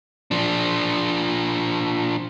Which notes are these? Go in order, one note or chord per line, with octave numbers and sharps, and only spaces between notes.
F3 D4